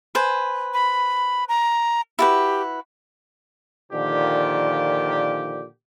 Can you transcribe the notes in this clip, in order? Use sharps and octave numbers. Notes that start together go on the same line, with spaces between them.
B4 C5 G#5
B5
A#5
E4 F#4 G4 B4
A#2 D3 D#3 F3 G4